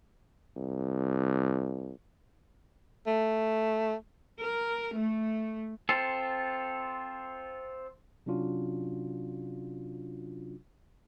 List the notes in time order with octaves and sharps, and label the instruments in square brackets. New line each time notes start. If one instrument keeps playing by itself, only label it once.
[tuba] C2
[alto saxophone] A3
[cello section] A#4
A3
[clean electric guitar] C4 F4 A4
[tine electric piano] C3 F#3 C#4 D4 F4 F#4